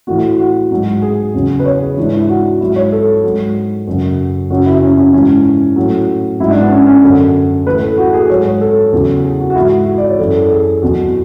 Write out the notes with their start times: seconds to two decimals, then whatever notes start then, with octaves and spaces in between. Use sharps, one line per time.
0.07 A2 E3 F#4
0.39 F#4
0.71 G#2 F#3
1.02 G#4
1.34 E2 C#3 F#3
1.60 B4
1.66 C#5
1.81 G#4
1.97 G#2 E3 D4
2.13 E4
2.29 F#4
2.61 G#2 F#3 E4
2.76 C#5
2.92 A4
3.24 G#2 F#3
3.87 F#2 C#3 F#3
4.50 F#2 C#3 F#3 F#4
4.66 E4
4.82 C#4
4.97 C#4
5.13 G#2 E3 C#4
5.76 A2 F#3
6.40 G#2 F#3 E4
6.50 D4
6.61 B3
6.71 C#4
6.87 C#4
7.03 F#2 D3 F#3
7.66 A2 E3 B4
7.82 A4
7.98 F#4
8.08 A4
8.13 G#4
8.29 G#2 F#3 C#5
8.45 C#5
8.61 A4
8.92 E2 C#3 F#3
9.24 G#4
9.40 F#4
9.50 F#4
9.55 G#2 E3 E4
9.87 F#4
9.98 D5
10.08 C#5
10.19 F#2 E3 A4
10.35 A4
10.50 G#4
10.83 E2 B2 F#3 F#4